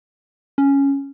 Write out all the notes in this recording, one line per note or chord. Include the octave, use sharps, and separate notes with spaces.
C#4